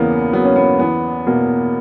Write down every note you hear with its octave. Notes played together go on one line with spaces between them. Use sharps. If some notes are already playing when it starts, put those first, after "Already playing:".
Already playing: E2 C#3 A#3 B3
F#3 B3
C#4
B3
E2 B3
B2 A#3